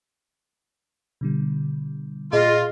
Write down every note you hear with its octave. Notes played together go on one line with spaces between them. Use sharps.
B2 D3 G3
A#2 F4 G#4 D#5